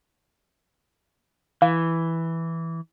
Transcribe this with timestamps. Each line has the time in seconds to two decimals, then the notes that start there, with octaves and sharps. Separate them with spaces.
1.62 E3 F5